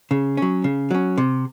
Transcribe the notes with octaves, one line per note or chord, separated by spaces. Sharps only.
C#3
F#3 C#4
C#3
F#3 C#4
C3